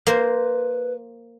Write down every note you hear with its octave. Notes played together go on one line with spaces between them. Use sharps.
A#3 B4 C5